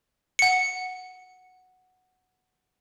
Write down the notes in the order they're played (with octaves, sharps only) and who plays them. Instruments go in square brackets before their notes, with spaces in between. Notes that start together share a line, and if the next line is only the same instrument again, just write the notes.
[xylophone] F#5 C#7